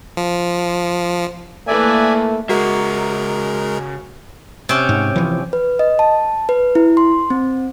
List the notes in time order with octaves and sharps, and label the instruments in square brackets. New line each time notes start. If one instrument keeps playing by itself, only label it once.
[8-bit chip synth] F3
[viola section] E3 A#3 B4 [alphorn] A3 [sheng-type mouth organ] D5 E5 G#5
[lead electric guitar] C#3 E5 [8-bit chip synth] G#3 A#4 [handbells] F#4
[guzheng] C3 C#4
[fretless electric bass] G#2
E3 F3
[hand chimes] B4
D#5
A5
B4
E4
C6
C4